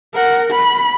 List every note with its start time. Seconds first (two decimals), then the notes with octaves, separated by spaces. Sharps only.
0.14 A#4 F#5
0.51 B5